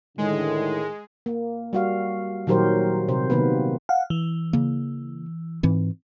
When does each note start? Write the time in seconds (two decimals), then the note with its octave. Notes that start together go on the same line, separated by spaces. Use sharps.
0.18 A2 D3 D#3 G#3
1.26 A#3
1.73 G3 F#4 F5
2.47 A#2 D#3 F#3 G4 A#4 C5
3.08 C3 C5
3.30 C3 D#3 A#3 B3 B4
3.89 F5 F#5
4.10 E3
4.53 C#3 A#3
5.63 G#2 E3 C4